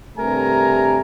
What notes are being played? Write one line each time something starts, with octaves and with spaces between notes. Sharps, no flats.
G2 C3 A3 A#4 G#5 A#5